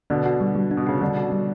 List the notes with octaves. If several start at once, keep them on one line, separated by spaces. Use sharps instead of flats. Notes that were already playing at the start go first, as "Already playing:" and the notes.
B2 D3 D4
F#4
G3
G3
D4
B2
C#3 F#4
B2 D3 G3
F#4
G3